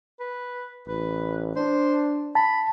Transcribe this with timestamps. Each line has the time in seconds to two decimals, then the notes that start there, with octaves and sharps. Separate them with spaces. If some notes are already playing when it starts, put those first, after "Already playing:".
0.20 B4
0.88 A1 B4
1.56 D4 C5
2.35 A5 B5